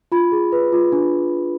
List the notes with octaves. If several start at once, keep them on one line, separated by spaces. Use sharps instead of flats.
F4 B5
G#4
B4
F4
D4